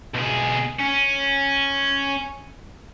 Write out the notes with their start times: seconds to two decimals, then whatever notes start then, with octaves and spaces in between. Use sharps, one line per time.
0.15 B1 G#4
0.80 C#4